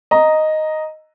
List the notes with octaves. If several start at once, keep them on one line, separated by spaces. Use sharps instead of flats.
D#5 A#5